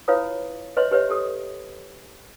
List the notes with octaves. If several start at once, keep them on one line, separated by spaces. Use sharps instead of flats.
E4 F4 B4 C#5 F5 D#6
B4 C#5 D#5 E5 C6
G4 B4 C#5 E5
G4 A4 D#6